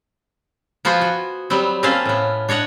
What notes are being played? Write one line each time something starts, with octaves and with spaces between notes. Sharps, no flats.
F3 B3 F4 F#4 C5 G#5
F#4
F#3 G3 B3 C4
A#3 C4 C#4 B4 F5 A5
A2 B3
D4 C#5 D#5 F#5 A#5